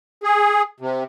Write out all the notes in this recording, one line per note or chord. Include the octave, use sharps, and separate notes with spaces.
G#4
C3